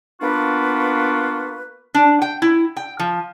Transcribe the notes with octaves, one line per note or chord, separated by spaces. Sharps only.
A#3 B3 D4 F4 F#4 B4
D4
G5
E4
G5
F3